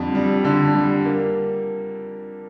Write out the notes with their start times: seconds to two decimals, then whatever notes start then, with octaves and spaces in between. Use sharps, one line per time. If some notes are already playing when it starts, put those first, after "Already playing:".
Already playing: F2 D3 G3
0.15 G3
0.44 D3
0.75 G3
1.05 A#3